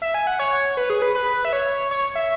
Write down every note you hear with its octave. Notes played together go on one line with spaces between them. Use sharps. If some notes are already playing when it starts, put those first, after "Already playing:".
E5
G#5
F#5
C#5
B4
G#4
B4
B4
E5
C#5
C#5
E5